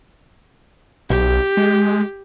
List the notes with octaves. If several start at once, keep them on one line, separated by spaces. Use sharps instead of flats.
B1 G4
G#3